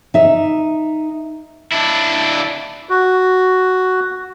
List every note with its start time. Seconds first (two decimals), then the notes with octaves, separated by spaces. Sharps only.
0.14 D#4 E5
1.72 D4 E4
2.89 F#4